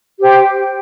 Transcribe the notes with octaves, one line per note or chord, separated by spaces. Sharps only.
G4 C5 G5